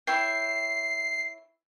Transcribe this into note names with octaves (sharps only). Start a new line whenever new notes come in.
E4 C#5 G5 C7